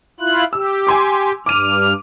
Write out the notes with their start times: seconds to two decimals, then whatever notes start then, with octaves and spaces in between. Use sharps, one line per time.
0.20 E4 F4 F#6
0.53 G4 E6
0.87 G#5 C6 D6
1.46 G2 D6 F6 D#7